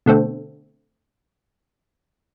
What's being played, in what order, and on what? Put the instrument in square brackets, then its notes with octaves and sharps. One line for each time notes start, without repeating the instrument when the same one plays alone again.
[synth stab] B2 D3 A3 C4